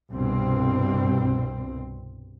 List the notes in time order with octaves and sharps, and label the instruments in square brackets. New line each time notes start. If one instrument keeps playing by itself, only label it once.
[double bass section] C2 G2 B2 C4